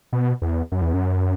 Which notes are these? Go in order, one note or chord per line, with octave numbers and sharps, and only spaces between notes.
B2
E2
F#2
E2
F#2